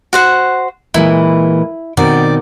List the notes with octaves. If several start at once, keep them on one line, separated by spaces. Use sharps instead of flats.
F#4 C5 F#5
A#2 E3 G#3 E4
B2 D#3 C4 D5